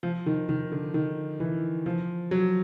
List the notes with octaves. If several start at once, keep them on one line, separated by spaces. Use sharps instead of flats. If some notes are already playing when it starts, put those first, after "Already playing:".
F3
D#3
D#3
D3
D#3
E3
F3
F#3